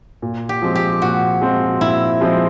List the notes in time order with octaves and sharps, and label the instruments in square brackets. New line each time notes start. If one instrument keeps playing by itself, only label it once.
[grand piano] A#2
[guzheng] G4
[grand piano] F3 G#3 C4
[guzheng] G4
[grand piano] A#2 [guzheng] F#4
[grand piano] F3 G#3 C4
[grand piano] A#2 [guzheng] E4
[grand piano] F3 G#3 C4